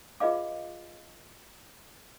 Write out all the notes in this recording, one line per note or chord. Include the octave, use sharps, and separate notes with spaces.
F4 G#4 B4 D#5 F5 D6